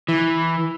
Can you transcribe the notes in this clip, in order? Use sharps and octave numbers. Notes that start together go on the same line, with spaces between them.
E3